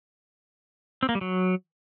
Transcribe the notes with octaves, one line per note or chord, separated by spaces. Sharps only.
C4
A#3
G3
F#3